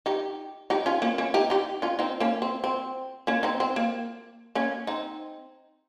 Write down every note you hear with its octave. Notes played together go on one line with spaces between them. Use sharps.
D#4 G4
D#4 G4
C#4 F4
A#3 C#4
A#3 C#4
D#4 G4
D#4 G4
C#4 F4
C4 D#4
A#3 C#4
C4
C4
A#3 C#4
C4 D#4
C4
A#3
A#3 C#4
C4 D#4